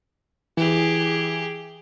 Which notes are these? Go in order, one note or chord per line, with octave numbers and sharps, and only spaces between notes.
E3 G4 G#4